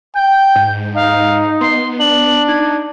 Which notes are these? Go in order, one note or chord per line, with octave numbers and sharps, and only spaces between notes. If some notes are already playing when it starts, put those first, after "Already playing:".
G5 G6
G#2
D#4 F5
B3 C6
D4 F#7
D#4 G#6